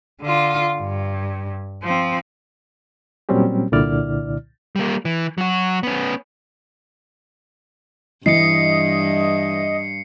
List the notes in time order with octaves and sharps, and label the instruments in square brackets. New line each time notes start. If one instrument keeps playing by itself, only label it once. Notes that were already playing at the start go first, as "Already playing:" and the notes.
[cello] D3 F4
G2
F3 C4
[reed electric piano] A#2 F#3 G3 C4 C#4 G4
C2 A#2 D3 E4 D5 F6
[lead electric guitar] G3 A#3
E3
F#3 F#4
B3 C#4
[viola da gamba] G2 [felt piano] E3 [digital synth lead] D#5 [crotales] C7 C#7